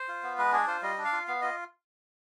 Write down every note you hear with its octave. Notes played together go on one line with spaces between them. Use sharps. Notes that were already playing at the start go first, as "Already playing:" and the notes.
Already playing: C5
F4
B3
G#3 B4
D4 G#4
F4 C5
G3 D#5
D4
F5
F4
B3 F5
F4 D#5